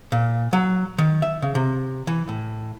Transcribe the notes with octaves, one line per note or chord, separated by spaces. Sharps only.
A#2
F#3
D#3
E5
C#3
C3
E3
A2